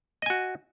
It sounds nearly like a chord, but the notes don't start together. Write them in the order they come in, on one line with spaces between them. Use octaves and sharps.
D#5 G#5 F#4